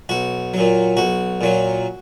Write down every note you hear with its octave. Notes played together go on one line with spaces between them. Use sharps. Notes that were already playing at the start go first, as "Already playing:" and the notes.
B1 F#4
A#2 F#3
B1 F#4
A#2 F#3